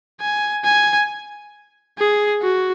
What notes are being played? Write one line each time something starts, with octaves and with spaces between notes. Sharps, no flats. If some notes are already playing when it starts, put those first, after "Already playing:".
G#5
G#5
G#4
F#4